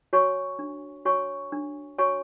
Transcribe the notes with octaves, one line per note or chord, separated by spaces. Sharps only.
F#4 C#5 G#5 C#6
D4
F#4 C#5 G#5 C#6
D4
F#4 C#5 G#5 C#6